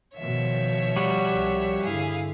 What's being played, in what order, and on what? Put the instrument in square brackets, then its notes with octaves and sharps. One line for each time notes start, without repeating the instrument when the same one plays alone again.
[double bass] B2 D#3 [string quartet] F3 C#5 E5
[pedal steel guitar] G3 F#4
[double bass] C2
[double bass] G2 D3 [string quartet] E4 G#4 F5